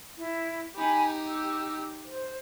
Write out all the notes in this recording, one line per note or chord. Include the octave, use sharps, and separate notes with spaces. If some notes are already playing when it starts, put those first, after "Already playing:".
E4
D#4 G4 G#5 B5
E6
C5